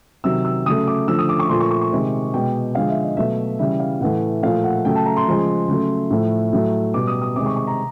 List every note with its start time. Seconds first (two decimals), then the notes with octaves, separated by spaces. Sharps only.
0.24 C3 D#3 F#3 E6
0.45 E6
0.66 C#3 F#3 A3 D#6
0.87 D6
1.08 D3 F3 A3 E6
1.19 D#6
1.29 D6
1.39 C#6
1.49 A#2 F3 A3 C6
1.60 C#6
1.71 C#6
1.81 C#6
1.92 C3 D#3 G#3
2.34 B2 G#3 G5
2.75 D3 F3 G#3 F5
2.89 E5
3.04 D#5
3.17 B2 F#3 A3 E5
3.59 C#3 E3 G3 E5
3.79 F5
4.00 A2 E3 A3 F#5
4.43 A#2 F3 A3 F5
4.64 F#5
4.85 C#3 F#3 A3 G5
4.96 A5
5.06 A#5
5.17 C6
5.27 C#3 F3 G#3
5.68 C#3 F#3 A3
6.11 A2 F3 A3
6.53 A2 F#3 A3
6.94 B2 G3 D6
7.07 D#6
7.22 D#6
7.36 C3 D#3 G#3 D6
7.46 C#6
7.56 C#6
7.67 A#5